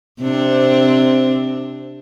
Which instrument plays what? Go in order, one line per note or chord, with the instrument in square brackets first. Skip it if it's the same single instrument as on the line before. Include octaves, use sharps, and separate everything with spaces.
[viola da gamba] C3 C4 D4